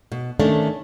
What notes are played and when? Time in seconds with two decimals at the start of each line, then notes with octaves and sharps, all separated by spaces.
0.12 B2
0.40 D#3 A3 C#4 D4